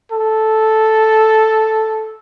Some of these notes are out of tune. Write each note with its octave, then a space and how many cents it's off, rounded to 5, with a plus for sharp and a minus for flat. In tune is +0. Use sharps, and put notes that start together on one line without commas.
A4 -5